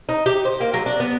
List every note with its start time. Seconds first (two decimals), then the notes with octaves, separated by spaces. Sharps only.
0.09 D#4
0.26 G4
0.45 C5
0.60 A#3
0.74 F#3
0.86 D4
1.00 B3